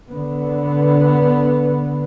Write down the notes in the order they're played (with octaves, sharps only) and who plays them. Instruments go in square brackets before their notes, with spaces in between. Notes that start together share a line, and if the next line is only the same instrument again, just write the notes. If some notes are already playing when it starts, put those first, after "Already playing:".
[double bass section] D3 B3